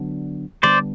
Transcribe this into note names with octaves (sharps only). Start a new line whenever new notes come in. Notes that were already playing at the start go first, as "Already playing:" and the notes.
Already playing: D3 F#3 B3 D4
D3 G3 B3 D4 C5 D5